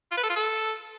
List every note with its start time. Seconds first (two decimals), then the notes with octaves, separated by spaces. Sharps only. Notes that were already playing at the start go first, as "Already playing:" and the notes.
0.11 F4
0.17 B4
0.24 A4
0.30 F4
0.36 A4